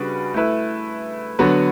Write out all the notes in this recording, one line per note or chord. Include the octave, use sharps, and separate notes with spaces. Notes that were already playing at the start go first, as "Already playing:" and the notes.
Already playing: C#3 G3 D4 F#4 B4
A3 E4 B4
D3 F#3 B3 F#4 B4